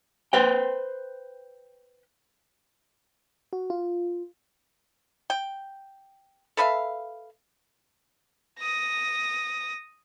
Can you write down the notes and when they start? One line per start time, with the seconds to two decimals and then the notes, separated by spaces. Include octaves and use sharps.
0.33 B4 C5 G5
3.53 F#4
3.70 F4
5.30 G5
6.57 A4 B4 E5 F5
8.59 D#6 A#6